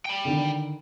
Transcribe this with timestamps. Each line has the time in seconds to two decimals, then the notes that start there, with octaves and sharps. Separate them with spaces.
0.05 G5 B5
0.25 D3 D#3